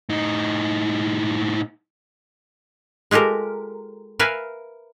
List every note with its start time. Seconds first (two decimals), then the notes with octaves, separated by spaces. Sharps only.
0.09 A2 D#4
3.11 G#3 F4 G4 A4 A#4
4.19 A#4 B4 E5 F5 G#5